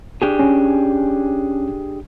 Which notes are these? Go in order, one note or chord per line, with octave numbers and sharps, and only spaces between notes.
D4 G4 G#4
C#4